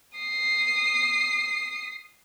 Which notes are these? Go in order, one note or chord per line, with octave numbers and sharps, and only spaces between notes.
D#6 C7